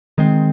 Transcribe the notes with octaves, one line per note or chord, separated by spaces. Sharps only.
D#3 G#3 C4